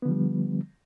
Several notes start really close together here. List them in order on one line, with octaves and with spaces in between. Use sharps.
B3 D3 F3 G3